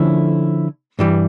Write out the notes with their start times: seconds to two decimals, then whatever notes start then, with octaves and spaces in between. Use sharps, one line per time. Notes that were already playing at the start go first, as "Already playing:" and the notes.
Already playing: D3 F3 A3 C#4 E4
0.99 G2 E3 G3